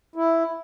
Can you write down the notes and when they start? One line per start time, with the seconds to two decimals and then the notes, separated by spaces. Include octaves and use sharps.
0.16 E4